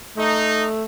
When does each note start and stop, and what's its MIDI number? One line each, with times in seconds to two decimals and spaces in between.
0.17 0.84 57
0.17 0.64 63